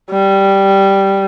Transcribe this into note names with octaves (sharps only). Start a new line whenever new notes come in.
G3